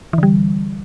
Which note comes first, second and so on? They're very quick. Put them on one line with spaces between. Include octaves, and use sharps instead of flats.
E3 D3 G3